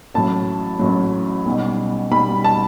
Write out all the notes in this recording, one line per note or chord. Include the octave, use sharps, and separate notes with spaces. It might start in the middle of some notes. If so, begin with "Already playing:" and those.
A1 A2 F#3 A5
A1 A2 F#3
B1 B2 G3
B1 B2 G3 B5
A5